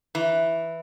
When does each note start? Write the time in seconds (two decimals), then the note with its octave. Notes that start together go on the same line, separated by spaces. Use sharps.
0.15 E3